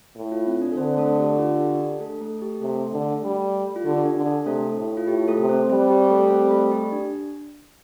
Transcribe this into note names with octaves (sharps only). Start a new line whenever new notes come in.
A2
F4
C4
D4
A4
D3 C4 C5
A3 A4
G4
F4
G4
D4
A3 A4
A3 A4
G4
C3 A3 A4
D3
G3
F4
D3 G4
D4
D3
D4
C3 A3 A4
A2
F4
A2 G4
A3 A4
C3
C4 C5
G3 C4 C5
G4
A3 A4
C4 C5
A3 A4
G4
D4